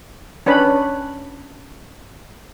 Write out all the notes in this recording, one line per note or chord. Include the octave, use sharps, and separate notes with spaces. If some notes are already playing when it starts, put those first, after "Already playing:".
C#4 D4 B4 B5